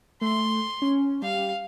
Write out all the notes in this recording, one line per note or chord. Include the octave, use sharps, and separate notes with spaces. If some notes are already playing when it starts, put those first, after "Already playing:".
A3 C6
C#4
G3 F5